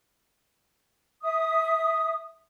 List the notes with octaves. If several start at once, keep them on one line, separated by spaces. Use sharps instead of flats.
E5 D#6